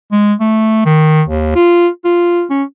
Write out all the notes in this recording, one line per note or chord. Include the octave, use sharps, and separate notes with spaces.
G#3
A3
D#3
D#2
F4
F4
C#4